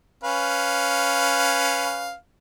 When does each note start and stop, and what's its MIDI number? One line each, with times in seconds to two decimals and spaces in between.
0.24 2.14 61
0.24 2.14 71
0.24 2.14 77